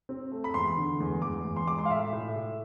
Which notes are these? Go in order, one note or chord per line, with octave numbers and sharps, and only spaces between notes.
C4
A3
B5
E2 C6
D3
E2
E2 D6
E2
C6
G#3 D6
C6
F5
A2 E5
A2
A2